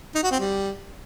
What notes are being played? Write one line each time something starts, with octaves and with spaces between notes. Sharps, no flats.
D#4
F#4
C4
G3